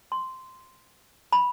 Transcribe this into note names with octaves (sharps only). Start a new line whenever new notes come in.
C6
B5